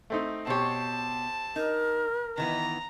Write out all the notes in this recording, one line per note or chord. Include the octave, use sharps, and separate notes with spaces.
A3 C4 D#4
B2 C4 G4 C#5 A5
D#4 A#4
D#3 E3 B3 A#5